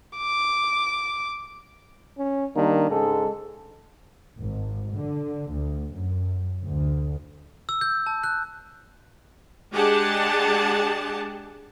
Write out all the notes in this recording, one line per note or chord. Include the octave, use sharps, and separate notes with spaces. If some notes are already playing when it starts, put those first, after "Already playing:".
D6
C#4
D#3 G3 A#3 D4
G#2 C#3 G#3 A4
G#1
D3
D2
F#2
D2
E6
G6
A5
F#6
G#3 D4 G4 G#4 F#5 A5